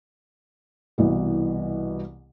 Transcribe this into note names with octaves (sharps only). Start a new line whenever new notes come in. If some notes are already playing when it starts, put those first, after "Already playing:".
C2 B2 E3